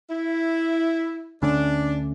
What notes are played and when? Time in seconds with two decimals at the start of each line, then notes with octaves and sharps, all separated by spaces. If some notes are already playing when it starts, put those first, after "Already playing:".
0.10 E4
1.42 D2 D3 A3 C#4 D4